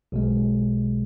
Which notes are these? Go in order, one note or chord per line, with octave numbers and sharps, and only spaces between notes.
B1 B2 G#3